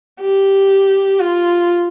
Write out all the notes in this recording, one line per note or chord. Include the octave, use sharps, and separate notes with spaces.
G4
F4